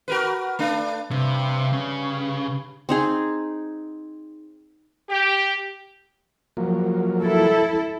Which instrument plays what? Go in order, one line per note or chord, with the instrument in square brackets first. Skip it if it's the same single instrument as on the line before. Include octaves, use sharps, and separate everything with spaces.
[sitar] F#4 A#4 B4
A3 D4
[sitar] G2 [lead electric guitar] C3
[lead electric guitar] C#3
[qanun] C4 D#4 G#4
[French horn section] G4
[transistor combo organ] F3 F#3 A#3
[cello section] E4 A4